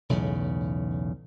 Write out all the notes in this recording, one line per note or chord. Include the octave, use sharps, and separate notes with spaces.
B1 E2 A2 C#3